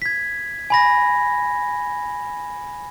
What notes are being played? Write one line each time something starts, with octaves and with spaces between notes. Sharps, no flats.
G#6 B6
G#5 B5 A#6